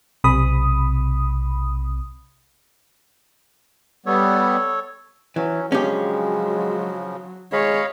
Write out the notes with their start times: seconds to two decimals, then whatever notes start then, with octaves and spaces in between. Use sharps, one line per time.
0.24 B1 C3 B5 D#6
4.06 G3 B3 A4 C#5
5.36 E3 F#3 C#4
5.72 C#3 F3 F#3 G#3 C#4 D4 G4
7.53 G#3 C#5 D#5 F5 B5